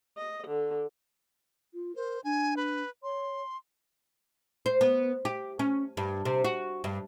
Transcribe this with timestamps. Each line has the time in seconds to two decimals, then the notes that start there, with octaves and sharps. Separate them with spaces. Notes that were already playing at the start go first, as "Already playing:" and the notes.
0.17 D#5
0.47 D3
1.74 F4
1.96 A#4 C5
2.24 D4 G#5
2.57 B4
3.03 C#5 C6
4.66 C5
4.81 B3
5.25 G4
5.59 C#4
5.97 G2
6.25 C3
6.44 F#4
6.84 G2